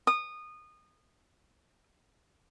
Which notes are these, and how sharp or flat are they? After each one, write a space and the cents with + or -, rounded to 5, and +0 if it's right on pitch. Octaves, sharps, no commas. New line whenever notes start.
D#6 -20